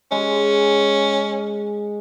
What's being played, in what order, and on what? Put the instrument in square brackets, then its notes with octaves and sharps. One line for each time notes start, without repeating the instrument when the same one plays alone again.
[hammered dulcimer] G#3 [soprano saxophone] C#4